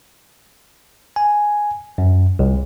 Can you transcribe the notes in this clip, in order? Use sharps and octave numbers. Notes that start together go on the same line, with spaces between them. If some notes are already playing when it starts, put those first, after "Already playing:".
G#5
F#2
C2